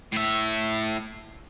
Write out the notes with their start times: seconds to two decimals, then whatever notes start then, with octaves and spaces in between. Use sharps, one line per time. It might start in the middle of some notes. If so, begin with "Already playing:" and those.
0.12 A2 E5